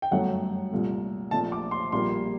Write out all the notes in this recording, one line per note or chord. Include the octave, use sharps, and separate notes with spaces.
G5
G1 F#2 F#3 A3 F#5
C2 A#2 A3
A#1 A#2 A3 A5
D6
C6
A#1 A#2 G3 A#3 C6